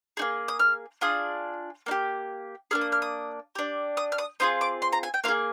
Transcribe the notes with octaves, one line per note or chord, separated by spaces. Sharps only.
A#3 D#4 G#4
D#6
F6
D4 F4 G#4 D#6
A#3 D#4 G4
A#3 D4 G#4 F6
D#6
F6
D#6
D4 G4
D#6
F6
D#6
C4 F4 G#4 D#6
D6
C6
A#5
G#5
G5
A#3 F4 G#4 F5